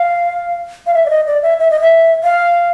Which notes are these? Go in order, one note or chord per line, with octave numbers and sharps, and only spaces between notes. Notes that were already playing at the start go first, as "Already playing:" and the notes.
Already playing: F5
F5
E5
D5
D#5
D5
E5
E5
D#5
E5
F5